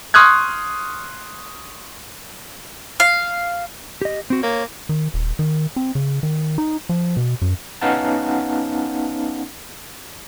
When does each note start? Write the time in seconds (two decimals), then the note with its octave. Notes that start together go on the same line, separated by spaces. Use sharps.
0.14 C6 C#6 D#6 F6 F#6 G#6
3.00 F5
4.02 G4 D#5
4.30 C4 F#4
4.43 A#3 C#5
4.89 D#3
5.14 D#1
5.39 D#3
5.76 C4
5.95 C#3
6.23 D#3
6.58 D#4
6.89 F3
7.17 B2
7.42 F#2
7.82 B3 C#4 D#4 F5 F#5 A5